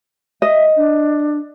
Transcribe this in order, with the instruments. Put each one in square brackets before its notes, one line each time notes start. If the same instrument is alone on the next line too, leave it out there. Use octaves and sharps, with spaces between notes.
[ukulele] D#5 [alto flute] E5
[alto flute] D4